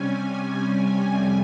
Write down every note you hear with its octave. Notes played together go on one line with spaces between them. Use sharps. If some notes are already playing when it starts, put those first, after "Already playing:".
Already playing: C3 G3 C#4 G#5
F2 C3 G3 G#5